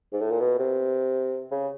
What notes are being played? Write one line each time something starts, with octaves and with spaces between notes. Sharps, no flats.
G#2
A2
A#2
B2
C3
C#3